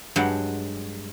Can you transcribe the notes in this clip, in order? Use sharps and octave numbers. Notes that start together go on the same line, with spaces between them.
G2 F#3 G#3 G4 F#5